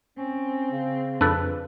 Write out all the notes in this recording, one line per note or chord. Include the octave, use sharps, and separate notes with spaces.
C4 C#4
C#3
F2 D4 A4 B4